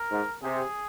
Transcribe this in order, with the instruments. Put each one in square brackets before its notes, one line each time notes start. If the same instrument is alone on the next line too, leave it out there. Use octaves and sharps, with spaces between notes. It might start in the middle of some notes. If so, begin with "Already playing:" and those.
Already playing: [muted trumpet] A#4
[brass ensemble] G#2
[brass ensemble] C3 [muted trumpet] G#4